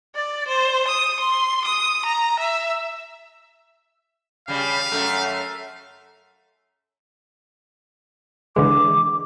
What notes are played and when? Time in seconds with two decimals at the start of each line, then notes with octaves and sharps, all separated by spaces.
0.15 D5
0.48 C5
0.88 D#6
1.20 C6
1.65 D#6
2.05 A#5
2.39 E5
4.48 C#3 G3 F5
4.92 F#2 A3
8.56 D3 E3 G#3 D6